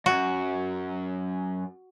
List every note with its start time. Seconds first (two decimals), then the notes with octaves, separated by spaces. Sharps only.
0.06 F#2 F#4